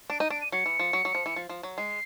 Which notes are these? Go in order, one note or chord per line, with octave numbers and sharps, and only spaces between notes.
D4 D7
D#4 D#7
D4 D7
D#7
F#3 C#7
E3
F3
F#3
F#3
F3
E3
F3
F3
F#3
G#3 C7